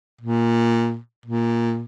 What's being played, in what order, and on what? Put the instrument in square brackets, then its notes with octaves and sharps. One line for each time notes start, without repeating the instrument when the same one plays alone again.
[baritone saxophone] A#2
A#2